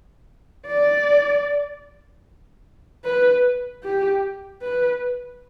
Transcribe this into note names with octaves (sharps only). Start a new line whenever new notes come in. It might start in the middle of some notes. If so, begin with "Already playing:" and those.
D5
B4
G4
B4